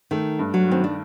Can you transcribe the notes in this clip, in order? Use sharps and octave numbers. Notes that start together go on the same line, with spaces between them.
D#3 A3
G2
F#3
D#3 C4
D4